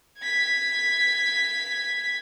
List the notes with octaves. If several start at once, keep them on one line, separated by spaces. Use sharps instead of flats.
G#6 B6